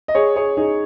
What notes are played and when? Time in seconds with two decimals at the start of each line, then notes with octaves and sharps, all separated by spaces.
0.08 D#5
0.15 G#4 C#5
0.36 G#4 C#5
0.57 D#4 G#4